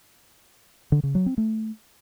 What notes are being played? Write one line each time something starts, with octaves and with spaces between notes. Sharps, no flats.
D3
C#3
F#3
C4
A3